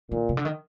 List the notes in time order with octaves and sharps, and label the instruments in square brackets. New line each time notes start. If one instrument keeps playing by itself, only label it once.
[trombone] A#2 [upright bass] D#3
[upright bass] C3
D3
D#3